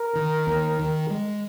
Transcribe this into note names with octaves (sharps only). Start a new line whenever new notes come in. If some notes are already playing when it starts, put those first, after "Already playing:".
Already playing: A#4
D#3
D#2
D#3
G#3